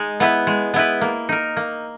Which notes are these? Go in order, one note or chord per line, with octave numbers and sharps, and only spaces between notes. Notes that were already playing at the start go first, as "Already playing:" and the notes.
Already playing: G#3 D#4
B3 E4 B4
G#3
B3 E4 B4
A#3
D#4 A#4
A#3